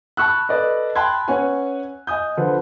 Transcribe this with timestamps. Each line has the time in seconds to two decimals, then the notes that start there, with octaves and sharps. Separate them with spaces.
0.17 A5 B5 C#6 E6 F#6
0.49 A4 B4 D5 D#5
0.95 G5 A5 B5 C6 F#6 G#6
1.28 C#4 B4 C#5 F#5 G#5
2.07 D#5 G#5 D#6 G6
2.37 D3 F3 B4 C5